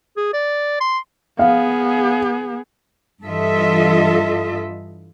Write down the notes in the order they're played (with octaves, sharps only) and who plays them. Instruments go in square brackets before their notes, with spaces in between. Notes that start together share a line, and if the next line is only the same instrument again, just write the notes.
[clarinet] G#4
D5
C6
[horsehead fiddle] B3 G#4 [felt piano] F5
[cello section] G2 E3 F4 A4 D#5 E5